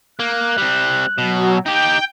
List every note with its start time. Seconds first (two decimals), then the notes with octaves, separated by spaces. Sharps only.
0.20 A#3 F#6
0.58 G3 C4
1.18 B2 F#3
1.66 D#4 G4 G5